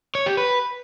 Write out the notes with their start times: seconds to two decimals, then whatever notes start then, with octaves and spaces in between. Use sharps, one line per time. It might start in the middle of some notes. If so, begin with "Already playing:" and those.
0.15 C#5
0.26 G4
0.37 B4